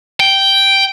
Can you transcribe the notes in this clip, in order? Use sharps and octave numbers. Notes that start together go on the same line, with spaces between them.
G5